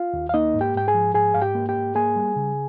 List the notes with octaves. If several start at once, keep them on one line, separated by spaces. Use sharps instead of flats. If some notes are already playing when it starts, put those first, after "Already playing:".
Already playing: F4 F5
D#2
F5
A#3 D#4 D#5
G#2
G4 G5
G#2 G5
G#4 G#5
F3
G#2 G#4 G#5
G#2 F5
G4 G5
A#3
G4 G5
G#2
A#3 G#4 G#5
G3
C#3